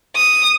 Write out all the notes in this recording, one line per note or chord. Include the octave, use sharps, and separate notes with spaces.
D#6